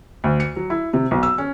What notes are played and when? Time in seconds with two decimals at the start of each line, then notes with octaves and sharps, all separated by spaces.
0.24 D2
0.40 C#7
0.56 F#3
0.70 E4
0.93 C3
1.11 B1
1.23 E6
1.38 C#4